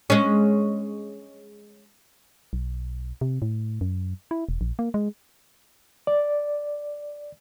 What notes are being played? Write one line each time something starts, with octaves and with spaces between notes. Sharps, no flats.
G#3 C#4
B1
C3
A2
F#2
E4
E1
A#1
A#3
G#3
D5